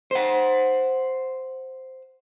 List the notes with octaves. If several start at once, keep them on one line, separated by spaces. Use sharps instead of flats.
C5 F#5